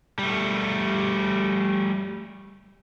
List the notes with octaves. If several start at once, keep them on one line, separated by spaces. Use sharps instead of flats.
G3 A3